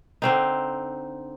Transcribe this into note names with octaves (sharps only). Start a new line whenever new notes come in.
D3 C4 D#4